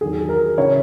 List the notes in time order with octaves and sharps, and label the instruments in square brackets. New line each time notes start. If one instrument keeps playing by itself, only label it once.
[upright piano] E2 D#3 F#3 G#4
A#4
C#3 E3 C#5